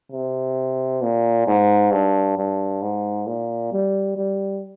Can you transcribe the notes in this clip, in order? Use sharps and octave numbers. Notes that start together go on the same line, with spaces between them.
C3
A#2
G#2
G2
G2
G#2
A#2
G3
G3